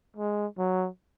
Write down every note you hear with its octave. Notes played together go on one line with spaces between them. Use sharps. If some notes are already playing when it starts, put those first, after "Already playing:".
G#3
F#3